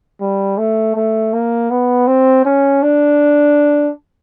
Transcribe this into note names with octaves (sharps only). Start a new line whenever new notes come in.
G3
A3
A3
A#3
B3
C4
C#4
D4